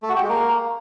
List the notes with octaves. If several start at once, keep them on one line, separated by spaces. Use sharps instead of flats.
A3
F#4
G4
G#3
A#3